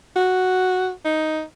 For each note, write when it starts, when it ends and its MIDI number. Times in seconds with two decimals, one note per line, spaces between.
0.16 0.90 66
1.05 1.42 63